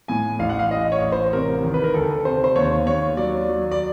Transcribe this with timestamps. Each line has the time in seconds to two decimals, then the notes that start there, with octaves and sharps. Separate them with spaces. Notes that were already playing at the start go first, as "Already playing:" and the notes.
0.08 A2 G#5
0.39 A1 F5
0.49 F#5
0.59 F5
0.70 A1 D#5
0.92 C#5
1.01 A1
1.12 C5
1.33 C3 A#4
1.64 D#3
1.74 B4
1.84 A#4
1.94 D2 A4
2.25 C3 C5
2.44 C5
2.56 D#2 C#5
2.86 D#2 C#5
3.17 F#3 D5
3.49 F#3
3.71 D5